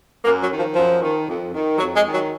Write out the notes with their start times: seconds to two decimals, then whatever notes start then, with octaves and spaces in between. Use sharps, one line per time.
0.25 F#2 A#3
0.42 F#3
0.50 D#3
0.59 F3
0.76 F#2 F3
1.02 D#3
1.27 F2
1.53 D#3
1.78 F2 F#3
1.96 G#3
2.04 D#3
2.13 F#3